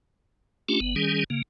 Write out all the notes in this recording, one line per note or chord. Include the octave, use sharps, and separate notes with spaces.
A3 C#4 D4 F4 G4
G1 B3
D#3 G3 C#4 G#4
C#3 A#3